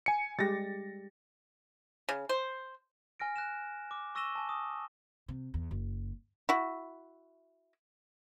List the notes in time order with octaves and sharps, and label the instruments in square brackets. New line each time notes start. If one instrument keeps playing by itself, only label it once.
[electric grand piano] G#5 C#7
[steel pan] G3 G#3 G4 [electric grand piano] A6 A#6
[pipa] C#3
C5
[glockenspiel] G#5 F6 A#6 D7
G#5 F#6 A#6 E7
D6
C#6 E6 A#6 D#7 E7 G7
G#5 A5
D#6
[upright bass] C3
E2
F#1
[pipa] E4 F#4